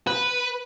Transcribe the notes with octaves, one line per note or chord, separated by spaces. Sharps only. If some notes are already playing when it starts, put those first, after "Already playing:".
B4